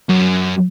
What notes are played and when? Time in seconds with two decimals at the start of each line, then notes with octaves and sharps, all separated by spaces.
0.09 F#2